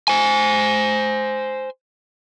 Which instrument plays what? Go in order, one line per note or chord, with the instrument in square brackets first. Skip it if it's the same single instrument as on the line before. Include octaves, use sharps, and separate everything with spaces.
[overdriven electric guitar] C5 G#5